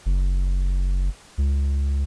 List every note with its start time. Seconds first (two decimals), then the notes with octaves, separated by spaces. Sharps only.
0.06 F#1
1.38 C#2